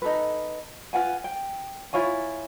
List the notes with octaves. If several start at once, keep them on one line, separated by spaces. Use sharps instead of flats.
D#4 A4 B4
F4 B4 F#5 G#5
G5
E4 F4 C#5 G#5